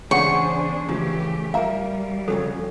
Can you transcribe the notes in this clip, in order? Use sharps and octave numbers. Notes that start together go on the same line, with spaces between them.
E2 C#3 D4 G#4 C5 C#5 F#5 C#6
C#3 E3 F3 A3 G4
G3 A#4 E5 F5 A#5
F2 C#3 F#3 A4